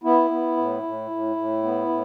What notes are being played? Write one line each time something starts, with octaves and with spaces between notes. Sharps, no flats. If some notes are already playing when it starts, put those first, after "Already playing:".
B3 E4
B3
A2
A2
A2
A2
B3
A2